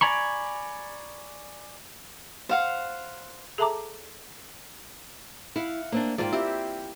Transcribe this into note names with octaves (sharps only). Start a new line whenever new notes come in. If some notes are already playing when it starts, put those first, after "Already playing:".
D5 G#5 A#5 B5 C#6
C5 F5 F#5
G#4 A4 E5 A5 A#5 D6
E4 F5 F#5
A#3 C4 D4
G#2 A#3 F4 A4 D5 G5
C4 E4 G4